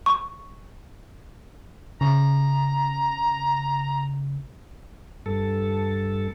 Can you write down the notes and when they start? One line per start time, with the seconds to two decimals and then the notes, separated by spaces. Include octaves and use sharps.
0.06 C#6
2.01 C#3 A#5
5.26 G2 A4